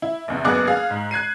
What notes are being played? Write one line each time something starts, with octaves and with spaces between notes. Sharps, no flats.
E4
A#1 E2 C3
F#1 G2 B3 G#4 D6 F#6
G#4 F5
G#2
F#6 G#6 C7 D#7